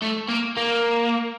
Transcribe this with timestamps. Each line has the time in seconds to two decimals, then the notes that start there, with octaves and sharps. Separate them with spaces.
0.02 A3
0.29 A#3
0.57 A#3